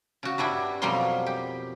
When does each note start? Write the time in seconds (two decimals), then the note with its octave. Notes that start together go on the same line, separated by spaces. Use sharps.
0.23 C#3 F#4
0.38 G2 G3 D4 E4
0.82 F2 B2 F#3 G3 A#3 C6
1.26 G4